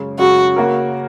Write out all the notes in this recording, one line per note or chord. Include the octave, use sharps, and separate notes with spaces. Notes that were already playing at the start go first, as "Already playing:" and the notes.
Already playing: F#2 C#3 G#3 C#4
F#2 C#3 G#3 C#4 F#4
C#3 A#3 F#4 A#4